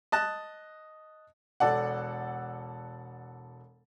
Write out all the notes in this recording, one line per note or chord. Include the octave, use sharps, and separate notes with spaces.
D#5 A5 F#6
E1 A4 D5 F#5